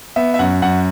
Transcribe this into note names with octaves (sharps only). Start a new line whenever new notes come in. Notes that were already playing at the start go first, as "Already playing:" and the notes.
B3 E5
E5
F#2 F#5
F#2 F#5